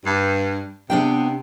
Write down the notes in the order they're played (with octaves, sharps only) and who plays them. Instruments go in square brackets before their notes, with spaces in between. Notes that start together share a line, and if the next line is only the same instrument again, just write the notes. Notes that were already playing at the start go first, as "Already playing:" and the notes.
[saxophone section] G2
[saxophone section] C3 [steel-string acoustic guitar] B3 D4 G5